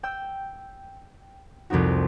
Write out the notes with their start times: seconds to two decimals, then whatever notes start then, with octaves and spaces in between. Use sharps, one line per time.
0.03 G5 E6 G6
1.70 C2 F2 C4 D#4 F#4